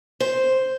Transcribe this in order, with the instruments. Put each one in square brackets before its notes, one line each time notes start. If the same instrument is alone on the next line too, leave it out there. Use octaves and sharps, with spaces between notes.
[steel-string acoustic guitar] C5